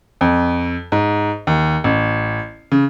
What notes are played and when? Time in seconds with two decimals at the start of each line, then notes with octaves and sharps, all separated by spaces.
0.21 F2
0.92 G#2
1.47 D#2
1.84 A1
2.72 C#3